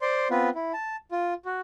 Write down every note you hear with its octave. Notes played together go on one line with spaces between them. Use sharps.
C5 D5 C6
B3 C4 F4 B4
E4
A5
F4
F#4